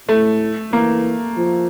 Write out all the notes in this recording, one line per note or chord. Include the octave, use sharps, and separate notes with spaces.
A2 A3
E3 A#3
F3